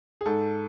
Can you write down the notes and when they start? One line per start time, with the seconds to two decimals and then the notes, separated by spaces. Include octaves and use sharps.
0.21 G#4
0.26 G#2 A4